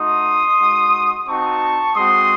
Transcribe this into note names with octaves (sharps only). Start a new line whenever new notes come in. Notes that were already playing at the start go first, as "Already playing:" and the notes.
Already playing: A3 D#4 F#4 C6 D#6
G#3 D#4 F#4
C4 D#4 F#4 A5 C#6
G#3 C4 F#4 C6 D#6